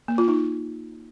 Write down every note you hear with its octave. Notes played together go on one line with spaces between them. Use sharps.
A#3
F4
D#4